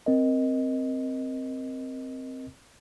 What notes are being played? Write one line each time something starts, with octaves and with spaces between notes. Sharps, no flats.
C4 A#4 D#5